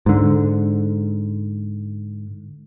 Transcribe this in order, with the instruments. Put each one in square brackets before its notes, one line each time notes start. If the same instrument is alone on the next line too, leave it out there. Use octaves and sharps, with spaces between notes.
[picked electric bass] G#2 D3